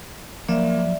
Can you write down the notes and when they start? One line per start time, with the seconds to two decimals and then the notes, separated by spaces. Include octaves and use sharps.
0.49 F3 F#3 A#3 D5 E5